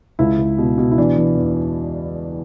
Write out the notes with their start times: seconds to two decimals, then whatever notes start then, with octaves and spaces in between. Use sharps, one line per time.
0.19 C#2 E4
0.38 C#2
0.58 B2
0.78 B2
0.91 E4
0.98 E3 D4
1.17 E3
1.37 E2